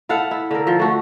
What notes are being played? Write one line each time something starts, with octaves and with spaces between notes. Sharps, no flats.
E4 A4 F5 F#5
E4
D3 A#4
F3
A3 F#4